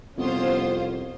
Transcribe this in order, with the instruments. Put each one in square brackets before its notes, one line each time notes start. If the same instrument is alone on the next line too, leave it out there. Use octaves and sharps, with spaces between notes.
[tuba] C2 [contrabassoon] F2 [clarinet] B3 [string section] C#4 F4 C5